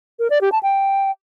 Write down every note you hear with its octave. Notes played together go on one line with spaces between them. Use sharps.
A#4
D5
G4
A5
G5